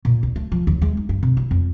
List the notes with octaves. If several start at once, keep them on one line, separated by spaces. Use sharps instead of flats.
A#2
D2
A3
F3
D#2
G#3
D#4
G2
C3
E4
F2